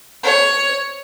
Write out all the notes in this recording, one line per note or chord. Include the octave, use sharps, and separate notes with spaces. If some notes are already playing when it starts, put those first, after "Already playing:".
C#5